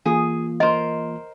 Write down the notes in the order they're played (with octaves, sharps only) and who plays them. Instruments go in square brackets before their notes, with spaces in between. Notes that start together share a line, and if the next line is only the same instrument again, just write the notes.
[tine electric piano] E3 A#3 F4 [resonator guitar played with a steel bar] G#4
[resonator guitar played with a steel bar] A#4 C5 [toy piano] D#5